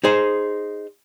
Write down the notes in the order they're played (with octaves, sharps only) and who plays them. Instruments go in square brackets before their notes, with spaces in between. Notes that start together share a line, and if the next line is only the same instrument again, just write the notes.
[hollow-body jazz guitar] D#4 G#4 C5